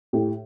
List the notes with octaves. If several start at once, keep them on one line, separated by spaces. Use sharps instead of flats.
A2 G4